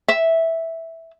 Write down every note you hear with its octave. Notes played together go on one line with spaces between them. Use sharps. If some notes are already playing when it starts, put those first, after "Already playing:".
E5